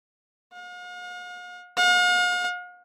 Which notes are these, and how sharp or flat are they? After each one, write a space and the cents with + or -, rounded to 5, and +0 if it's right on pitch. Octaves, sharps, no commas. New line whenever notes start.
F5 +45
F5 +45